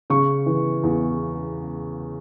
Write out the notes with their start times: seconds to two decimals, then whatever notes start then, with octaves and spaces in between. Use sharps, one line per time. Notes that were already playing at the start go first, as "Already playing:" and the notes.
0.10 C#3 C#6
0.46 E3
0.83 E2